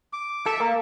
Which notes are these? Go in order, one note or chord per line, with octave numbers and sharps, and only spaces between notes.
D6
A4 E5
A#3